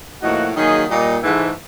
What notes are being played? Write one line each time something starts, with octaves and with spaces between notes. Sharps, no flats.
A2 F3 A#3 D#4 F#4
D#3 F#3 A#3 D#4 G#4
A#2 G3 A#3 D#4
G#2 E3 A3